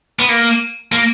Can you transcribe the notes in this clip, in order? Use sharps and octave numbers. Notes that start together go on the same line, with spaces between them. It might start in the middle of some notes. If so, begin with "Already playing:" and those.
B3
A#3
A#3